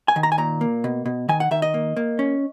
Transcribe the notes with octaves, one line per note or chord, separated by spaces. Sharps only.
G#5
D#3
A#5
G#5
A#2 A#5
A#3
B2
B2
D#3 G#5
F#5
D#3 E5
D#5
A#3
A#3
C#4